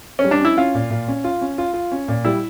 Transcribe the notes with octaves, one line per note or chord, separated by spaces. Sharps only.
C#4
G3
D4
C#4 E4
C#4 F4
A#2
A#2
C#4
F4
C#4
F4
F4
C#4
A#2
G3 E4